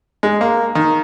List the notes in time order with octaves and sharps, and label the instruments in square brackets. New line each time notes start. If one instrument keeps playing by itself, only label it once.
[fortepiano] G#3
A#3
D#3